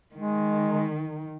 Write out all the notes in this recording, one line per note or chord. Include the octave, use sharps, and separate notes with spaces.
D#3 G#3